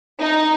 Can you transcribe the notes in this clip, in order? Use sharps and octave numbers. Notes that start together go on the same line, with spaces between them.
D#4